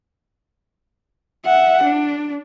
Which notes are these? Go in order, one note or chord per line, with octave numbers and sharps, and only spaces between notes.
E5 F#5
D4